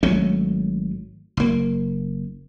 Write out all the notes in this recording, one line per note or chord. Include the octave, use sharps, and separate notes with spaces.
G#1 F#3 A3 C#4
F#1 A#3